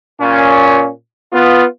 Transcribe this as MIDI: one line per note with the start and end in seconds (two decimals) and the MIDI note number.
0.20 0.89 46
0.20 0.89 61
1.32 1.64 59
1.32 1.64 65